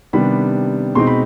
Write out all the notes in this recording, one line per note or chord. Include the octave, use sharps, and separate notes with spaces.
C3 D#3 G3 B3 D4 B5
B2 G#3 C4 D#4 C6
B5